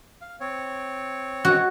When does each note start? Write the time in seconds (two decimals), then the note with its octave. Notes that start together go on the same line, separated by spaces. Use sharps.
0.21 F5
0.41 C4 C#5
1.45 F#4